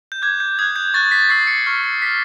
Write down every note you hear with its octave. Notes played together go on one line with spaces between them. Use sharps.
G6
D6 F#6 G#6
G6
D#6 F#6 G#6
G6
C#6 F#6 A6
B6
C#6 E6 G6 C7
C#7
C#6 F6
C7
D6 F6 B6